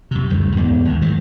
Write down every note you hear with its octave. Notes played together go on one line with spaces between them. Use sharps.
F#2 C3
D2 G2 C#3
E2 G#2 B3
D#2 D#3
G#2 D#3 E3 F#3